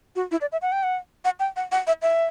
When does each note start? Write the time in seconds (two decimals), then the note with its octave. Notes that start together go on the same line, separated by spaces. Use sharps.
0.16 F#4
0.32 E4
0.41 D5
0.52 E5
0.62 F#5
0.72 G5
0.83 F#5
1.25 F#5
1.40 G5
1.56 F#5
1.72 F#5
1.87 E5
2.02 E5